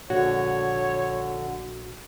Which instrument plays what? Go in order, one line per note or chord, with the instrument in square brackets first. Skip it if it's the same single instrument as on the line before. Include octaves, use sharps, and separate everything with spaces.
[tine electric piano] A#1 [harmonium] D3 [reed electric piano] F#4 [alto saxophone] C#5